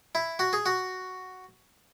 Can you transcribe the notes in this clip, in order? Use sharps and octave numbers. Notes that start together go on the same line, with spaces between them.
E4
F#4
G#4
F#4